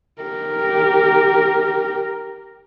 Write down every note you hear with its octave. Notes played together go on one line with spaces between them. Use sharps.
G4 A#4